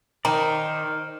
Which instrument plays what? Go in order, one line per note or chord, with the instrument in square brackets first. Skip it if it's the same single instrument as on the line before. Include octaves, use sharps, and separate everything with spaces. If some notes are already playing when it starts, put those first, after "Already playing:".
[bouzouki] D#3 [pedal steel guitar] A#4 C5 D5 [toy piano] A#5